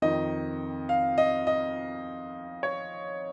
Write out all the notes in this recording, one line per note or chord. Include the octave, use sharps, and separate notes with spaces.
F2 D#3 D#5
F5
D#5
D#5
C#5